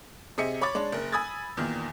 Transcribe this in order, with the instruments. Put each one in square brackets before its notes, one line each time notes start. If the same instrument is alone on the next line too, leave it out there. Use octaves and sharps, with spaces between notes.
[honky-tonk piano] C3 G#4 D#5 E5 C#7
C#5 B5 C#6 D6 A6
G#3 D4 C#5
F#1 A#4
G#5 B5 D#6 E6 G#6 A6
E2 A#2 D#3